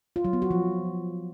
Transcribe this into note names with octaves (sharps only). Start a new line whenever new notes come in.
F4
F#3
B3
F#4
F3